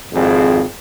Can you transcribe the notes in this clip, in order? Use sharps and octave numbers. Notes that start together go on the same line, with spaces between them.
G#1 F2 C4 G#4